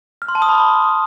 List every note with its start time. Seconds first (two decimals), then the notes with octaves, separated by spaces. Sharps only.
0.22 F6
0.28 C6
0.35 A5
0.42 D#6
0.49 B5